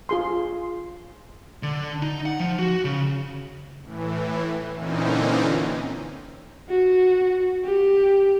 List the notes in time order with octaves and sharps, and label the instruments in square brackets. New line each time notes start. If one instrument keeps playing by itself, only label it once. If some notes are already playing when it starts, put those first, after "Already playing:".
[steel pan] F4 G#4 C6
[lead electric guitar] D3
D#4
F#5
F3
F#4
C#3
[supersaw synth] A2 E3
A#2 D3 E3 C4 C#4 D#4
[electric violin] F#4
G4